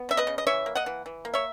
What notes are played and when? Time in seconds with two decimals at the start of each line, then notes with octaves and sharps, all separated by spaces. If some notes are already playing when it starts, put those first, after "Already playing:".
Already playing: B3
0.09 C#3 E5
0.17 B4 D#5
0.27 C#3
0.38 D#5
0.47 E3 C#5 E5
0.66 A#3
0.75 D#5 F#5
0.86 E3
1.06 E3
1.25 A#3
1.34 C#5 E5